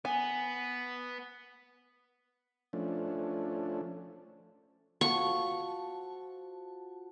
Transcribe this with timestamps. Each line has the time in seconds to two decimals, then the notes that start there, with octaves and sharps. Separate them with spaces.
0.05 B3 G#5
2.73 F3 A3 C#4 D4
5.01 F3 F#4 A4 C#6